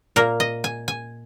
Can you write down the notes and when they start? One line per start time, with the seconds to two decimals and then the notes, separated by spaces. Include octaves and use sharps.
0.16 A#2 A#3 A#4
0.40 D#5
0.64 G#5
0.88 G#5